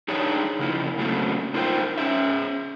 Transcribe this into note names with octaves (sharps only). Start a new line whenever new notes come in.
D4 D#4 G4 G#4 C#5
C#3 F3 A#3 E4
A2 C#3 F#3 A3 A#3 C4
D4 D#4 F4 A#4 C5 G5
C#4 G#4 E5